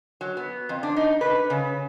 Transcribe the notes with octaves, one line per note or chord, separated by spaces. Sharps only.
F#3
B3
F2
D4
D#4
B4
C#3